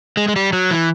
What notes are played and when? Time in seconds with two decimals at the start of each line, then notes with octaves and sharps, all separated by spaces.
0.17 G#3
0.28 G#3
0.36 G3
0.53 F#3
0.71 E3